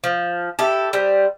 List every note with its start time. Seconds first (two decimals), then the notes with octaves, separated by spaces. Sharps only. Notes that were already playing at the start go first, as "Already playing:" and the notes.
0.04 F3
0.59 E4 G4 A4
0.93 G3 C4